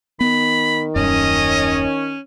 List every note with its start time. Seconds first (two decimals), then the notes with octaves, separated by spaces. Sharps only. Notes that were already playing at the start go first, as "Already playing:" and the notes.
0.21 D#3 B3 B5
0.96 D#1 F#2 C#4 D#5